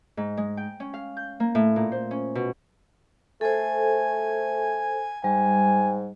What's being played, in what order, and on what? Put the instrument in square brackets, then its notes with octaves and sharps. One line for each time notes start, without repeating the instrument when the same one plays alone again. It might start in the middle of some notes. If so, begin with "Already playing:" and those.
[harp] G#2
G#3
G5
C#4
F5
G6
A#3
A2
A#2
C5
C#4
B2
[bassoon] A3 [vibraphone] A4 C5 [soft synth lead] G#5
[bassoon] G#2 [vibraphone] G3 [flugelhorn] G#5